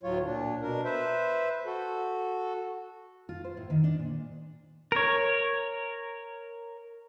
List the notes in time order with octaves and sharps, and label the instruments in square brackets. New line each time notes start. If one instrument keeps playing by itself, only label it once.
[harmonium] D2 A2 F#3 F4 C#5
A#2 D4
B2 D4 A#4
B4 C5 E5
F#4 A4
[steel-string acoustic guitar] F4
C5
A2
D#3
D4
A#2
[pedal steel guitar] A#4 C#5